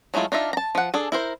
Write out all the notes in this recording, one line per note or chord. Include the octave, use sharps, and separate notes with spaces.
F#3 G#3 A3 E4 F4
D4 D#4 F4 E5
A5 A#5
F3 F#5
D4 G#4 A4
E4 A#4 C5